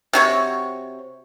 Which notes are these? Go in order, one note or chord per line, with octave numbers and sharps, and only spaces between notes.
C3 F#4 C#5